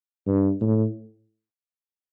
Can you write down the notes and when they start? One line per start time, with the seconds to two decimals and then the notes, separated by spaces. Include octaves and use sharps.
0.27 G2
0.61 A2